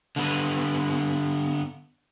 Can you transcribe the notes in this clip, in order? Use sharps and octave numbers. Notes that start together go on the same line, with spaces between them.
D3 B3